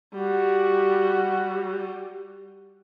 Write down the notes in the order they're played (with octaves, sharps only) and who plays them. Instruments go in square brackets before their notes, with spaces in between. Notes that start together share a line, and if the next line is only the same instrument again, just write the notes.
[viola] G3 [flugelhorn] F#4